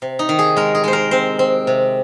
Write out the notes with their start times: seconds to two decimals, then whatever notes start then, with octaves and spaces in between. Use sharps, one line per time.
0.02 C3
0.19 D#4
0.29 D#3
0.39 G#4
0.57 G#3 A#4
0.75 G#4
0.84 G#3 C5
0.93 A#4
1.11 C4 C5
1.39 C4
1.67 C3